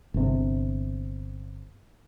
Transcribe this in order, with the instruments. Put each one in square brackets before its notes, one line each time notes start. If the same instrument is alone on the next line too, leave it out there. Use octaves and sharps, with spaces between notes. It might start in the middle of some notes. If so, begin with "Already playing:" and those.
[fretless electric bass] G1 C3